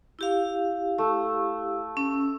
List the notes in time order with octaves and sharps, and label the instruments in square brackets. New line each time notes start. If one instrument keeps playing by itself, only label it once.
[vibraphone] E4 G4 F5
[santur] A3
[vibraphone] C#4